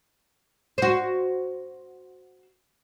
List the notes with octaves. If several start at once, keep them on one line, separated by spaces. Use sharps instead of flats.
F#4 C5